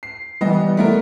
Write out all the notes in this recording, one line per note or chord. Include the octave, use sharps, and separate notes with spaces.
C7
E3 G3 B3 D#5
A3 B3 A#4